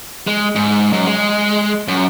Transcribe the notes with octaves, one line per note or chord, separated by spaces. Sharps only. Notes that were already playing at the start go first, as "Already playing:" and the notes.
G#3
G#2
F#2
G#3
F#2